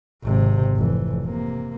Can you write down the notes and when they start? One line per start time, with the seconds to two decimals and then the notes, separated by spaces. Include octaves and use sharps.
0.24 G#1 C3
0.77 F1 E3
1.23 C3 A#3